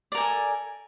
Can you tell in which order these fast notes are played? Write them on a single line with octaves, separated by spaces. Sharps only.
D5 A#4 G#5 A4